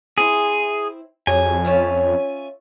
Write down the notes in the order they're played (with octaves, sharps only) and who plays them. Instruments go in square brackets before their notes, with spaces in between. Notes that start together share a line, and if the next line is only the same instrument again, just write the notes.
[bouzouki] C4 E4 [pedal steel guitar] G#4
[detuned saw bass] F2 [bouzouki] F#3 G4 G#4 [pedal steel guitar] G#5
[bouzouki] C#4 F4 E5